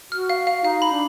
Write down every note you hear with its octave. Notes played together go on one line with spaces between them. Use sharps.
F#4 F6
F5
F5
D#4 F5
B5
D4